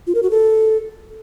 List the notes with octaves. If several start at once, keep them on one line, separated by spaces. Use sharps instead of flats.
F4
A#4
F#4
A4